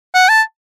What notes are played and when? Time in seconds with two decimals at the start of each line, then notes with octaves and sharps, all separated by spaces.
0.14 F#5
0.29 A5